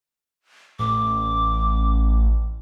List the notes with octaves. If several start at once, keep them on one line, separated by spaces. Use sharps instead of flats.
A1 D6